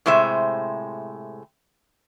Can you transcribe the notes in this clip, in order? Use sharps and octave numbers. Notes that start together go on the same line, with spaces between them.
A2 C3 G#3 C5 E5